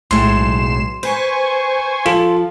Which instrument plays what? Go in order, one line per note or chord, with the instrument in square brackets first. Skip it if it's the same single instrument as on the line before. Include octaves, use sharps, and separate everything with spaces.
[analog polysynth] B1 C7 E7 [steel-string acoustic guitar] A2 G#3 [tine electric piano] C6
[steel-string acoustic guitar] B4 [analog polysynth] C5 G#5 C#6
[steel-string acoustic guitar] F3 [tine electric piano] F4 A4